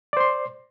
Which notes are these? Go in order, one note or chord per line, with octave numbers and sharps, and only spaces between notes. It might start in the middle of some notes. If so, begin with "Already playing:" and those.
C5 D5 C6